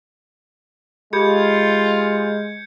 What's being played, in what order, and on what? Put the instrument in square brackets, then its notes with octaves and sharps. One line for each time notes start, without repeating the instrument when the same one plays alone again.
[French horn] G#3 [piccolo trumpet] F4 [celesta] G4 A4 B5 [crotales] G6 G#6 C#7